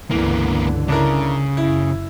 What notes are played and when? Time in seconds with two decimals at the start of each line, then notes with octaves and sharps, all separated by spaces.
0.11 C#2 G2 D3 E3 A#3 B3
0.88 C#3 D4 E4 A#4
1.57 F#1 E4